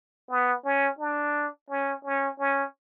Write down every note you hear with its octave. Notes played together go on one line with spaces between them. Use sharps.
B3
C#4
D4
C#4
C#4
C#4